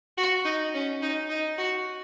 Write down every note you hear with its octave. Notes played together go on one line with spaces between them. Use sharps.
F#4
D#4
C#4
D#4
D#4
F#4